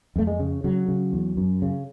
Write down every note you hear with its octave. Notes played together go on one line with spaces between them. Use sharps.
F2 A3
G#3
C#3
C#3 F#3
C#3
E2
F#2
C#3